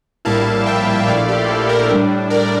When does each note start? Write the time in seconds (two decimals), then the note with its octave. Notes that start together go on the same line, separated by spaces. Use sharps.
0.25 A#1 A2 G3 A#3 E4 F5 A5
0.66 E5 G5
0.97 G5
1.07 A#1 A#2 A3 E4 D5 F5
1.28 G4
1.48 A4
1.69 G4 A#4
1.89 A2 G3 D4
2.30 A#4 D5